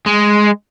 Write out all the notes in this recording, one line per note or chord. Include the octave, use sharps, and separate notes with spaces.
G#3